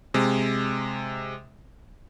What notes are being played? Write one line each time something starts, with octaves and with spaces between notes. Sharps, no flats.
C3 G#3